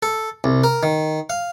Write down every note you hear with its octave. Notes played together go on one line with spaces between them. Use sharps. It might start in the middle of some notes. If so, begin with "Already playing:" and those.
A4
C2
A#4
D#3
F5